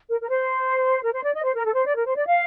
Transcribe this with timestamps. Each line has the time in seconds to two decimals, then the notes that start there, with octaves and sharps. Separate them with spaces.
0.09 A#4
0.20 A#4
0.29 C5
1.03 A#4
1.12 C5
1.23 D5
1.34 D#5
1.44 C5
1.54 A#4
1.64 A4
1.74 C5
1.86 D5
1.96 A#4
2.05 C5
2.16 D5
2.26 F5